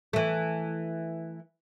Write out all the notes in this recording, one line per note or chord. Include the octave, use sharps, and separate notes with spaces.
E3 A3